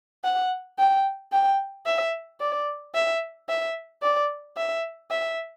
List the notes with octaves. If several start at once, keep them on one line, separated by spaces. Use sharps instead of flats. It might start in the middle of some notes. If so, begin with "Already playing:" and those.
F#5
G5
G5
E5
D5
E5
E5
D5
E5
E5